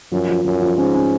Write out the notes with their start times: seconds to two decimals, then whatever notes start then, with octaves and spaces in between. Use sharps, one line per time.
0.12 F#2 F3
0.28 F3
0.45 F#2 F3
0.62 F3
0.78 G#2 C#4
0.95 C#4